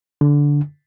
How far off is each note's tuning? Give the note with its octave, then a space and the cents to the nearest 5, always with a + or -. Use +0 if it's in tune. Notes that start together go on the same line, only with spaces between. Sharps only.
D3 -15